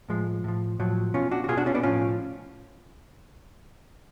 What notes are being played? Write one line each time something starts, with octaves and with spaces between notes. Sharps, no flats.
A2 F3 G#3
A2 F3
A2 F3 F#3
B2 C#4 F4
D4 F#4
F#4
B2 F4 G#4
D4 F#4
C#4 F4
B3 D4
A2 F3 C#4 F4